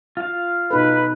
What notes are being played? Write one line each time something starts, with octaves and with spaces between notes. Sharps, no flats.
F4 F5
B2 D#4 A4 B4